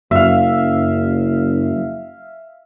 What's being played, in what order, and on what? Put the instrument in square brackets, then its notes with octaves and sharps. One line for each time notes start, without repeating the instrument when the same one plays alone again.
[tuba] F#1 [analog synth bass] F#2 [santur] E5 F5